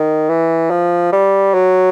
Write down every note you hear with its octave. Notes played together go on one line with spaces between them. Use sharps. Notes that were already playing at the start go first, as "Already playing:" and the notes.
Already playing: D#3
E3
F3
G3
F#3